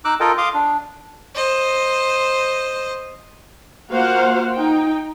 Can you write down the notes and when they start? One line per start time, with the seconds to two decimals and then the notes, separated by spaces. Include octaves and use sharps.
0.05 D#4 D6 E6 F#6
0.20 F4 A4 A#4 D#5 G5
0.38 F5 C6 D6 D#6
0.54 D4
1.35 C5 D#5
3.90 A#3 F4 F#4 C5 F5 F#5
4.54 D#4 G5